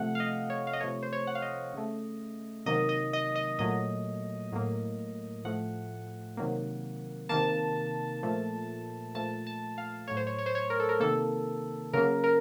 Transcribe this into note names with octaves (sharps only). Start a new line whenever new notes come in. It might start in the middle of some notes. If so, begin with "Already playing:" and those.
Already playing: C3 F3 A3 F#5
F5
D#5
C#5
F5
D#5
C3 F3 A3 C#5
C5
C#5
F#5
F5
D#5
C#3 A3
C3 D#3 F#3 A#3 D#5
D#5
D#5
D#5
A#2 F#3 A3 D#5
A2 F#3 A#3
A2 F3 A3 F#5
C3 D#3 F#3 A#3
C3 D#3 A#3 A5
A#2 F3 A3
A#2 F3 A3 A5
A5
F5
A2 F#3 A3 C#5
C5
C#5
C#5
C5
C#5
A#4
A4
A#4
C3 D#3 A#3 A4
C#3 F#3 A#3 A#4
A#4